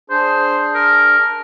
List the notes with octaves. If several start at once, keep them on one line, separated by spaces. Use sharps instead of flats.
D4 G#4 C5
A#4